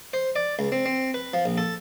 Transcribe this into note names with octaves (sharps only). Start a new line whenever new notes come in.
C5
D5
C#2
C4
C4
B4
F3
A#1
A4